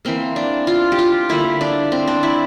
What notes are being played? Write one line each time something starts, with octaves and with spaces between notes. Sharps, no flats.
E3 A#3 C4
D4
F4
G4
F4
D3 G3 A#3 E4
D4
C4
D4
E4